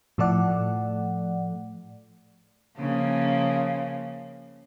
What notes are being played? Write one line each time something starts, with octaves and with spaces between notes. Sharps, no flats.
A2 F3 A3 A4 D5 F#5
C#3 F3 A#3